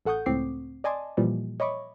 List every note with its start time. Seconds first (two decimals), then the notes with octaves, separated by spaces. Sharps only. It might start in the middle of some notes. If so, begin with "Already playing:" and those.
0.05 A1 A4 F#5 C#6 D#6 G6
0.26 C#2 A2 C4 D6 C7
0.84 D5 D#5 G#5 A5 C6 D6
1.17 A#2 E3 F3 G3
1.60 C#5 D#5 E5 B5 C#6 D6